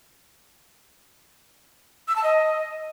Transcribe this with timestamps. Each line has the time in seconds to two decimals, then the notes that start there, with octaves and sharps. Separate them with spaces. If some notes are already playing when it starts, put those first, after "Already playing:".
2.08 E6
2.16 A5
2.24 D#5